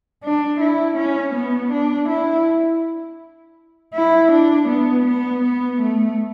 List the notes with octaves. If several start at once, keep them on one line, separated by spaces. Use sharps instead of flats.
D4
E4
C#4
B3
D4
E4
E4
D4
B3
B3
B3
A3